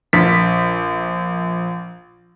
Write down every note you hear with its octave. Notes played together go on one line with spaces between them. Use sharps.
A#1 B6